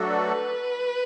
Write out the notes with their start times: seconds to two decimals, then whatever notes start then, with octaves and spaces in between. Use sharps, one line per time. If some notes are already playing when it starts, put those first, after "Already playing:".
Already playing: F#3 A3 D4 F#4 A4
0.09 B4